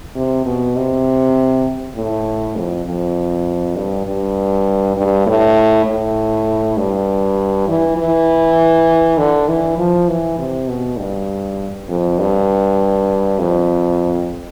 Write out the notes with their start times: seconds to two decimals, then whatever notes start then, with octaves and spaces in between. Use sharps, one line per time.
0.16 C3
0.46 B2
0.76 C3
1.95 A2
2.56 F2
2.86 F2
3.76 G2
4.07 G2
4.97 G2
5.27 A2
5.86 A2
6.77 G2
7.68 E3
7.97 E3
9.18 D3
9.48 E3
9.78 F3
10.08 E3
10.38 C3
10.68 B2
10.99 G2
11.88 F2
12.19 G2
13.39 F2